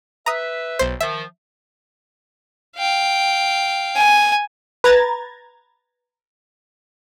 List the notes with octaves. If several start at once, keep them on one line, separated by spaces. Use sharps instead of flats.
B4 E5 A#5 D#6
B1 C5
D#3 F3 E5
F5 G5
G#5
B4 A#5 G#6 A6